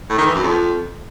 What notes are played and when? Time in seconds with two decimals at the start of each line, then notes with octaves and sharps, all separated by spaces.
0.10 A2
0.18 D#3
0.26 E3
0.35 F#2
0.43 F2